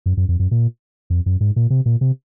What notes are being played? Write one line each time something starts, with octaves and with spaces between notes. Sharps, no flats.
F#2
F#2
F2
F#2
A#2
F2
F#2
G#2
A#2
C3
A#2
C3